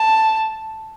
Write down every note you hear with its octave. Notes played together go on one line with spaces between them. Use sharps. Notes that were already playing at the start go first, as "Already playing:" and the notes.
Already playing: A5